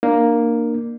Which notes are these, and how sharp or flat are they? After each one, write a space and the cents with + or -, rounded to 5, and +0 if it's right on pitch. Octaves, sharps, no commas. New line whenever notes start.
A#3 +0 D4 +30